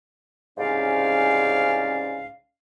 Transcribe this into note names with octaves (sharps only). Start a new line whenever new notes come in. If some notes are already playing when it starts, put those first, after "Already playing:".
C2 G#2 C#3 C#4 D5 F5